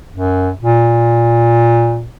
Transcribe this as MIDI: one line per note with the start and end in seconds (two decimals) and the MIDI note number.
0.12 0.51 42
0.62 2.05 46